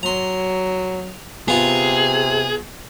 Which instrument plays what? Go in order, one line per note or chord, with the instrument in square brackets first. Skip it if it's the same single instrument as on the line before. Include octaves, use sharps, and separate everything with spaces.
[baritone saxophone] F#3 [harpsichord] A#5 C6
[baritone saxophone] C3 [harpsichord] B3 F4 A#5 [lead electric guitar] G#4